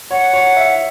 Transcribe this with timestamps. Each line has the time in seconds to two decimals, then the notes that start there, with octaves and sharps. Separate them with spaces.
0.11 C#5 F#5
0.33 C#5
0.57 E5